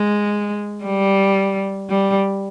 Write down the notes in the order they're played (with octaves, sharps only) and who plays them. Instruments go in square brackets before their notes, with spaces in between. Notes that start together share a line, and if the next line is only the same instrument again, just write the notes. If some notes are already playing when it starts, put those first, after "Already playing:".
Already playing: [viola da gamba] G#3
G3
G3